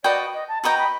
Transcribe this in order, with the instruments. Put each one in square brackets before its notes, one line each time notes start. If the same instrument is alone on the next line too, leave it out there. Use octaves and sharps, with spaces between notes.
[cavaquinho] F#4 B4 D#5 G5 [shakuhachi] D5
[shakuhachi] D#5
A5
[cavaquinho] F#4 B4 D#5 G5 [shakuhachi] A#5
[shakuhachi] B5